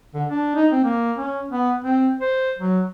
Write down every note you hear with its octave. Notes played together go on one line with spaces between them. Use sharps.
D3
D4
D#4
C4
A#3
C#4
B3
C4
C5
F#3